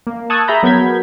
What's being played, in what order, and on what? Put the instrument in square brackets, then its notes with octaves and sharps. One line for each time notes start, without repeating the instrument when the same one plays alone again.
[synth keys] A#3
A5 C#6 D#6 E6 F#6 G#6
G#4 E5 A#5 B5 G6
F#3 B3 A#4 G6 G#6 B6